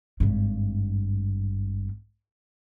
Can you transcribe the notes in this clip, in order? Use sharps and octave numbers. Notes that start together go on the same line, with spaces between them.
G#1 G2